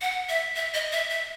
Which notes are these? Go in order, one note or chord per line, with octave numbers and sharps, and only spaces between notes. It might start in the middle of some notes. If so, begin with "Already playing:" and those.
F#5
E5
E5
D#5
E5
E5